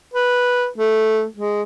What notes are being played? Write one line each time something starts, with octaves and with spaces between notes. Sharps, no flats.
B4
A3
G#3